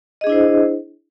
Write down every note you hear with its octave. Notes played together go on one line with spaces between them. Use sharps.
D4 E4 G#4 C5 D#5